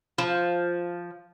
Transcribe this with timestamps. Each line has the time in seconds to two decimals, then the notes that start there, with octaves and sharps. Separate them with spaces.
0.18 F3